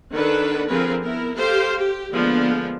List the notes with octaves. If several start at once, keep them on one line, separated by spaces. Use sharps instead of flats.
D#3 D4 A4 B4 F#5
D3 F3 C4 G#4 A#4 B4
B3 E4 A#4
G4 A4 C5 F5
G4
D3 F3 G#3 A#3 B3 D4